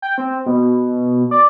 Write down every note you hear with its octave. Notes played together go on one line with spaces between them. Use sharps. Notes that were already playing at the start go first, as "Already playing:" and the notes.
G5
C4
B2
D5